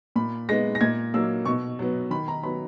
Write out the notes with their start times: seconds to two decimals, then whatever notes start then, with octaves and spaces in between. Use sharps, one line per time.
0.16 A#2 B5
0.49 G#3 B3 A#6
0.75 A#6
0.81 A#2 G#6
1.14 F#3 A#3 E6
1.45 B2 C#6
1.79 F#3 B3
2.10 D#3 B5
2.28 A#5
2.43 F#3 B3 B5